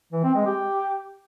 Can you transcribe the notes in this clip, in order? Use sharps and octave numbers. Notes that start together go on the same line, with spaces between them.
E3
C4
G#3
G4